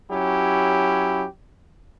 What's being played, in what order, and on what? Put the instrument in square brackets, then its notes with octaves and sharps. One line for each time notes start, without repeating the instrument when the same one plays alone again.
[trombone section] F#3 C#4 E4 G4